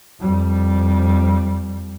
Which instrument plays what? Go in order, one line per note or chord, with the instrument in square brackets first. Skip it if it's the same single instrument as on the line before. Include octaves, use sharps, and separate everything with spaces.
[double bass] F2 G3